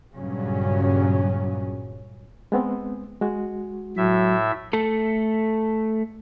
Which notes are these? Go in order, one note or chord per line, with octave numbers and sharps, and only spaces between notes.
G2 A#2 C#3 F#3 C#4
G#3 B3 C4
G#3 F#4
A2 F#3 E5
A3 A4